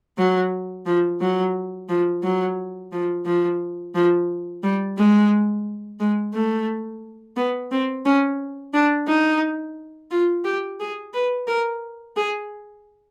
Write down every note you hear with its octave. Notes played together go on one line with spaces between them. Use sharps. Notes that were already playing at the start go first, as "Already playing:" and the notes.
F#3
F3
F#3
F3
F#3
F3
F3
F3
G3
G#3
G#3
A3
B3
C4
C#4
D4
D#4
F4
G4
G#4
B4
A#4
G#4